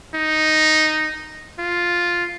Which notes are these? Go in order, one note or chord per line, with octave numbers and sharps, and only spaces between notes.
D#4
F4